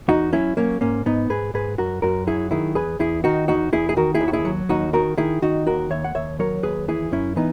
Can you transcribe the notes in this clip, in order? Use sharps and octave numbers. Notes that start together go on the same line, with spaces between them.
E2 D#4 F#4
F#3 C#4 E4
F#3 A#3 C#4
G#2 A#3 C#4
G#2 B3 D#4
G#2 G#4 B4
G#2 G#4 B4
F#2 F#4 A#4
F#2 F#4 A#4
F#3 E4 G#4
D#3 E4 G#4
E2 G#4 B4
E2 E4 G#4
D#3 D#4 F#4
E2 D#4 F#4
E2 E4 G#4
G#4
D#3 F#4 A#4
E4 G#4
D#2
F#4
E4 G#4
F#3
D#2 D#4 F#4
D#3 F#4 A#4
D#3 E4 G#4
D#3 D#4 F#4
D#2 F#4 A#4
D#2 C#5 E5
F#5
D#2 C#5 E5
F#3 A#4 C#5
D#2 G#4 B4
E3 E4 G#4
F#2 C#4 E4
E3 B3 D#4